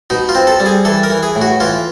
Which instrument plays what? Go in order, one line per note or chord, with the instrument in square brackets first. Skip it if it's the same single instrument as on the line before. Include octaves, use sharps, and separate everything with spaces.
[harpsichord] B2 D#4
F4
C4
A4
G3
G#4
E3 A4
A#4
E3
G#4
A2
F#4
E3 F4